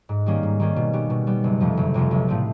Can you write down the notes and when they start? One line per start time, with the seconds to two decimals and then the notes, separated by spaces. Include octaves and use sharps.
0.09 G#2
0.26 D#3 G3 A#3 C#4
0.43 G#2
0.60 D#3 G3 A#3 C#4
0.76 B2
0.93 G3 B3
1.10 B2
1.27 G3 B3
1.44 F#1
1.60 F2 C3 F3 A3
1.77 F#1
1.94 F2 C3 F3 A3
2.11 B1
2.28 A2 F3 A3 C4